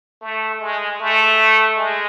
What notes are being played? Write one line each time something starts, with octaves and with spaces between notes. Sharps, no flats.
A3
G#3
A3
G#3